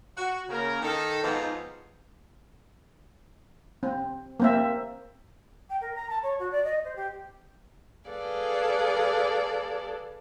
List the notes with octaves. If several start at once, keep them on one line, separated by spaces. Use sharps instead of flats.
F#4
C#3 A#3 A#4
D#3 D#4 A4
G#2 F3 B3 C4 D#4 F4
C4
A#3 C4 E5
G5
A#4
A#5
A5
C#5
F#4
D5
D#5
C5
G4
G#4 A4 B4 D5 F5